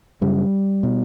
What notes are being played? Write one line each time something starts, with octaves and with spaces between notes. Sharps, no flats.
F#2 C#3 G3
B2